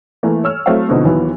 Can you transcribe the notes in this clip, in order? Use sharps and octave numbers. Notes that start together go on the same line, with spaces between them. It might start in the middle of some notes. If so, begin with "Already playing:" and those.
E3 A3 A#3
C#5 E6 F6
F#3 A3 C4 E4 E5 F5
B2 D3 F3 C4 D#4
D#2 D#3 E3 F#3 B3